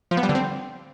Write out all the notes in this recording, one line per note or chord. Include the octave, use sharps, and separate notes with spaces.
F3
B3
G3
D3
C4